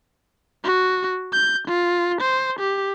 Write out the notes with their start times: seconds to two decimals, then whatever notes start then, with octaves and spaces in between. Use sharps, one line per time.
0.64 F#4
1.33 G6
1.68 F4
2.21 C5
2.60 G4